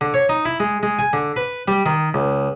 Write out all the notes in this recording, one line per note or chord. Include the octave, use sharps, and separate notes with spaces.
D3
C#5
D#4
E4
G#3
G#3
G#5
D3
B4
G3
D#3
C#2